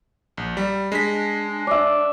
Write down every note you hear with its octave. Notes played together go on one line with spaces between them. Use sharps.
A#1
G3
G#3 D4 B6
D5 E5